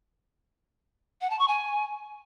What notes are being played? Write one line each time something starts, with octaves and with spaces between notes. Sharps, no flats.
F#5
A5
C#6
G#5